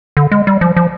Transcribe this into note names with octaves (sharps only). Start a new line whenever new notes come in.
D3
G#3
G3
F3
F3